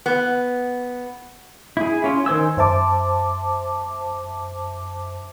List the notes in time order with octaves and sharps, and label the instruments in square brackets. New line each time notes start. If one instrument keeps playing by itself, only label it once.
[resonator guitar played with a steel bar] B3
[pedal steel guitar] E4 G#4
C#4 F4
D#3 C5 G#5 E6
[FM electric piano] F#2 C5 E5 A5 D6